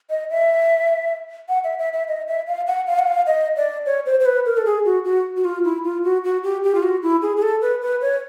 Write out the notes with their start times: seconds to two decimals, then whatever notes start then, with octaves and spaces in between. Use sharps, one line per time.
0.10 D#5
0.30 E5
1.49 F#5
1.64 E5
1.79 E5
1.93 E5
2.08 D#5
2.28 E5
2.47 F5
2.67 F#5
2.87 F5
2.99 F#5
3.07 F5
3.27 D#5
3.57 D5
3.86 C#5
4.06 C5
4.20 C5
4.26 B4
4.46 A#4
4.57 A4
4.66 G#4
4.85 F#4
5.05 F#4
5.37 F#4
5.45 F4
5.64 E4
5.84 F4
6.04 F#4
6.24 F#4
6.43 G4
6.64 G4
6.75 F4
6.83 F#4
7.03 E4
7.22 G#4
7.37 G#4
7.42 A4
7.61 B4
7.82 B4
8.02 C#5